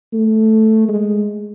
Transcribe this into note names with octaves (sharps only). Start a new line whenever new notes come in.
A3
G#3